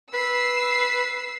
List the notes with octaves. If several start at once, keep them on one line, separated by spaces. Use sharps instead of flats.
B4 E6 C7